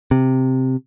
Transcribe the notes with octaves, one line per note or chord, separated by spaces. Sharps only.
C3